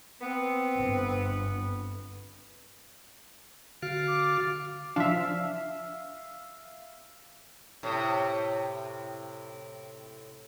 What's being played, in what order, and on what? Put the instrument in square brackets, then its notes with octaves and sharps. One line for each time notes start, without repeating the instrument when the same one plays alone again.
[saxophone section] B3 [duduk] C4
[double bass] G1
[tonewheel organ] D3 F#4 [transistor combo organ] F5
[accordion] D6
[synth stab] F3 D4 [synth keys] E5 F5
[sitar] A2 C3